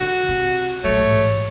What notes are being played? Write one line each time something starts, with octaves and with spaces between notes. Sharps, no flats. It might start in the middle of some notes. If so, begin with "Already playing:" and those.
D3 F#4
C3
A#1 F#3 A3 C#5
A1 G#2